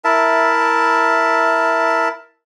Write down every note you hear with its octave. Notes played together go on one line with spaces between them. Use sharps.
E4 A#4 E5 A5